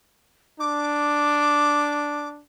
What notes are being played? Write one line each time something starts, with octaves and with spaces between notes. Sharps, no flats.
D4 D6